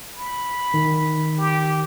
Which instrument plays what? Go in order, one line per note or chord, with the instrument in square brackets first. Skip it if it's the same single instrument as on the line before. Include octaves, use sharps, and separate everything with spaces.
[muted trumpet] B5
[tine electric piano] D#3
[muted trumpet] G4